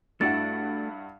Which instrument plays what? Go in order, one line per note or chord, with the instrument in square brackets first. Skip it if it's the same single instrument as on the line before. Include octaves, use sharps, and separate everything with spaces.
[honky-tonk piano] G2 E4 F#5 [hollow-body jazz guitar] A3 D4 F#4 [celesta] A6